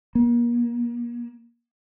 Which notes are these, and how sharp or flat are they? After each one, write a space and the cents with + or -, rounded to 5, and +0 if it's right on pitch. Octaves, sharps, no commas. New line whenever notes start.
A#3 +35